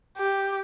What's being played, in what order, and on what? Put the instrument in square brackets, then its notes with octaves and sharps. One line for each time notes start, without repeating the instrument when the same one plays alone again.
[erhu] G4